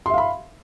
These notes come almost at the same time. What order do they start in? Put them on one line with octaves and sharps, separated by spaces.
C6 E5 F5 B5